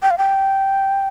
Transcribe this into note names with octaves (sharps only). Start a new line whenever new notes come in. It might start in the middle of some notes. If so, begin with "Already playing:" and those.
G5
F5
G5